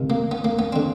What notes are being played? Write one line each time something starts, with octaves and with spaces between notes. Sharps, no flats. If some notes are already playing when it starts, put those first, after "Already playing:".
Already playing: C#2 C3 D#3
A#3
B3
A#3
B3
D3 C4